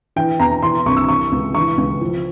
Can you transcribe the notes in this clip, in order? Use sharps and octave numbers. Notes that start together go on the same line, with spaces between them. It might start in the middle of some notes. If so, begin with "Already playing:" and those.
E3 G5
E2 A#5
E3 C6
C2 C#6
E6
E3 C#6
C#2
E3 C#6
C#2
F3